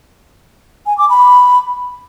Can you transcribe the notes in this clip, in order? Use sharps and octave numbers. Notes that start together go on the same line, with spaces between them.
G#5
D6
B5